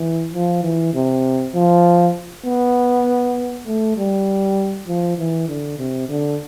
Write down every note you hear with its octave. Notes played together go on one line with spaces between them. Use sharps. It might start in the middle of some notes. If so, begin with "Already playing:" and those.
Already playing: E3
F3
E3
C3
F3
B3
A3
G3
F3
E3
D3
C3
D3